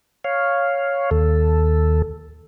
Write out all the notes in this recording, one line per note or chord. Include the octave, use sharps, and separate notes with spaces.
C#5 F5
D#2 A4